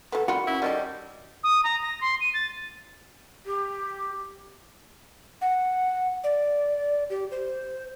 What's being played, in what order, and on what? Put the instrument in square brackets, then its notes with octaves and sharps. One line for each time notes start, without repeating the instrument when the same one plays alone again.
[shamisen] F#3 B3 [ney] A4
[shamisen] D#3 G3 F4 [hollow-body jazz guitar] F#4 [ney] B5
[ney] C#4 [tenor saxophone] E4
[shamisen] D#3 C#4 A4 [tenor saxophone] G3 [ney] D#5
[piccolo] D#6
A#5
A#6
C6
D#7
A6
[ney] G4
[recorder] F#5
D5
G4
C5